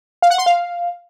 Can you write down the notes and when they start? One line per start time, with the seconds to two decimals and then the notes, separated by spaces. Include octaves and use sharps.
0.22 F5
0.30 F#5
0.38 C6
0.46 F5